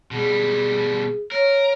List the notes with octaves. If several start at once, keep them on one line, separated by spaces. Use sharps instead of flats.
B2 G3 G#4
A#4 C#5